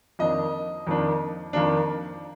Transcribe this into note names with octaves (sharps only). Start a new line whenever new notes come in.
F2 D#3 A#3 D4 D#5
F2 D#3 A#3 D4
F2 D#3 A#3 D4